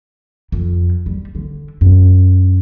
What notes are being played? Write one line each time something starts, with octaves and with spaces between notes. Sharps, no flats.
F2
G3
D3
F#2